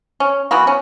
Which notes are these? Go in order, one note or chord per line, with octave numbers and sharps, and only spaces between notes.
C#4
E3 A#3 B3 F#4
C#4